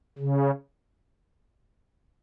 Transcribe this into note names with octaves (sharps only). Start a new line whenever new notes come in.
C#3